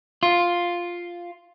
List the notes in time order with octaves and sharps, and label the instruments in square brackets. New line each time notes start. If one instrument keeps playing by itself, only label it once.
[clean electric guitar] F4